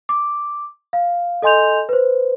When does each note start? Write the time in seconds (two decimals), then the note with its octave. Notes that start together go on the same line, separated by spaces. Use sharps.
0.09 D6
0.93 F5
1.42 A4 D#5 G#5 C6 G6 F7
1.89 B4 C5